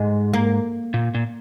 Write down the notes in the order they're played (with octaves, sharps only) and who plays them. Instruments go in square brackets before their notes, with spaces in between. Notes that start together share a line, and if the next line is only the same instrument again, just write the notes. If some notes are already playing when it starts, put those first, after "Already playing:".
Already playing: [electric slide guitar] G#2 [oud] G#3
[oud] A#3
[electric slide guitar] A#2
A#2